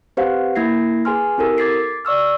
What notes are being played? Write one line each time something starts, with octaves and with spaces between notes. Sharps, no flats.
C4 G4 B4 C5 F5 F#5
A#3 E4 G#6 A#6 C7
G#4 B4 G#5 C6 F6
C4 E4 G4 A4 A#4
D6 G#6 A6 B6 C7 D7
D5 C#6 E6 F6